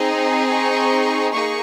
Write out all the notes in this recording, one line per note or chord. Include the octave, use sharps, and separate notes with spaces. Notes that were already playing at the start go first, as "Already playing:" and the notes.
Already playing: C4 D#4 G#4
C#6
A#3 D#4 G#4 C#6